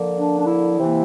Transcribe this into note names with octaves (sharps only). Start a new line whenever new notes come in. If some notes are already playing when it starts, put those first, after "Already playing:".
Already playing: D3 F3 A#3
D4
D4
E4
C3 E3 A#3